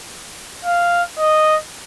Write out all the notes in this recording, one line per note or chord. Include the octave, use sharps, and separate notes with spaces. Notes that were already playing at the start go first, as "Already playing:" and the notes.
F5
D#5